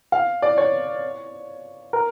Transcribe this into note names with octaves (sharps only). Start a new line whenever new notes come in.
F5
D5
C#5
A#4